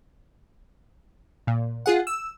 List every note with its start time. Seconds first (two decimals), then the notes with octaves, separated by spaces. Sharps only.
1.47 A#2
1.86 F4 G#4 F#5
2.07 E6